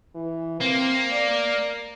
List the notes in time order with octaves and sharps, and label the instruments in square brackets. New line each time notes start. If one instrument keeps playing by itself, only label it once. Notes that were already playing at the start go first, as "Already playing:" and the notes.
[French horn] E3
[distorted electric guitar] A#3 [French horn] C4
[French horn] D5